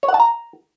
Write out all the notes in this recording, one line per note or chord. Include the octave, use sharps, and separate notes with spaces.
C#5
F#5
A5
A#5